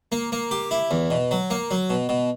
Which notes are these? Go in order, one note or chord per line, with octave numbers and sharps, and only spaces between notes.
A#3
A#3
G4
E4
E2
B2
F#3
A#3
F#3
B2
B2